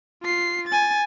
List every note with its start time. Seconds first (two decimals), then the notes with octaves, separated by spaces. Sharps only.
0.23 F4 C7
0.68 G#5 A6